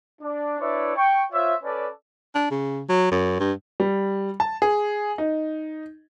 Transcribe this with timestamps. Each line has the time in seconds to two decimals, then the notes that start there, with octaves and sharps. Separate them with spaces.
0.22 D4
0.60 D4 E4 B4 C#5 D5 E5
0.96 G5 C#6
1.32 F4 C5 C#5 E5
1.63 C#4 A4 B4 D5
2.35 D4
2.51 C#3
2.89 F#3
3.11 F#2
3.39 G2
3.80 G3
4.40 A5
4.62 G#4
5.18 D#4